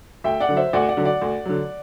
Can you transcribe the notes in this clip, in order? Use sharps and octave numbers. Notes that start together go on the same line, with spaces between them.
D2 E5 G5
D5 F#5
D3 F#3
C5 E5
D2 D5 F#5
D5 F#5
D3 F#3
D5 F#5
D2
D3 F#3